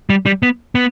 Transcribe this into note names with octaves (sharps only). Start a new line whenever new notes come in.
G3
G3
B3
B3